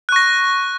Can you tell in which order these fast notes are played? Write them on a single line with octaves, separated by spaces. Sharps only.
F#6 C#6 A#6